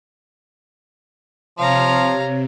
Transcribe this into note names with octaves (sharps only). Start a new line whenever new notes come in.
C3 F3 C#5 F5 A#5